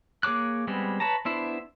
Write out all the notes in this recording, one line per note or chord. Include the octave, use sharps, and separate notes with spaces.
A#3 G#4 C#5 D6 F#6
G3 G#3 B3 C4
B4 C#5 A5 A#5
B3 D4 E4 C5 E5